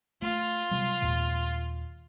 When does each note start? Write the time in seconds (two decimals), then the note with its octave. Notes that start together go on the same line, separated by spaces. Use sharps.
0.22 A3 F4 C6
0.71 C3 F#3 G3
1.02 D#2 A#2 G#3